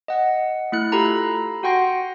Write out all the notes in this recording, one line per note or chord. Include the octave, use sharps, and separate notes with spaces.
D#5 F#5
A3 E4 F#6
F4 G4 A4 A#5 B5
F#4 F#5 G5 C6 A#6